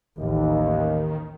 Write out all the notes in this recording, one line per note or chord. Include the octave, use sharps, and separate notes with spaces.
A1 D#2 D#3